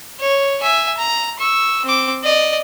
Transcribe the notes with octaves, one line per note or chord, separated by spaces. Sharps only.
C#5
E5 G#5
A#5
C#6 E6
C4 D6
D5 D#5